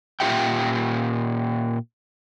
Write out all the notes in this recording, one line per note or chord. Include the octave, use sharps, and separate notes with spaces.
A#2 G3 F4 G4 E5 G5